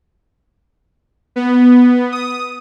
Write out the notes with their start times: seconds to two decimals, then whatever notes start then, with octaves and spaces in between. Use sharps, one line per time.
1.36 B3
2.12 D#6